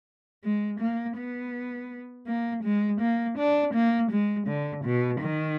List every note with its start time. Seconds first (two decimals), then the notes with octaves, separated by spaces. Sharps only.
0.44 G#3
0.80 A#3
1.17 B3
2.27 A#3
2.64 G#3
3.01 A#3
3.38 D4
3.74 A#3
4.11 G#3
4.47 D3
4.85 B2
5.21 D#3